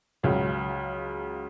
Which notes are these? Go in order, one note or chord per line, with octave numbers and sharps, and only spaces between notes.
C#2 C#3 F#3